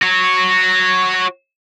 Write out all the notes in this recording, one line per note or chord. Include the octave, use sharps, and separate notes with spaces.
F#4 C#5